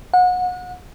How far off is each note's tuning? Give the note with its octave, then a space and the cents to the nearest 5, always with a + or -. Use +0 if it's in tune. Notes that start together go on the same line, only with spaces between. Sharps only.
F#5 -30